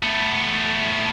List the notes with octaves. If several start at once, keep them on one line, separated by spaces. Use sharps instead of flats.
A3 B3